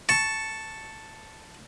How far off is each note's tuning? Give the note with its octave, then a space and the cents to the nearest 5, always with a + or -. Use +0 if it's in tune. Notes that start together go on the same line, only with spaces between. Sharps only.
A5 +0 C#6 +0